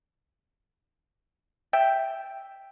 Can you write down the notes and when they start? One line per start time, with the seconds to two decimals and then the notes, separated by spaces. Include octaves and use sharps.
1.73 E5 G5